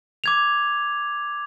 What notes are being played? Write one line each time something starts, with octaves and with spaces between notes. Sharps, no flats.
D6 G#6 F7